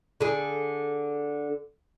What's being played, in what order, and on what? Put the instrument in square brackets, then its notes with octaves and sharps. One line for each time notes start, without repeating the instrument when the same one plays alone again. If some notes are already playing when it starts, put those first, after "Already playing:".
[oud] D3 G#4